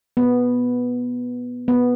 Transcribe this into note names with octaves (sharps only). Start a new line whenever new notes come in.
B3
B3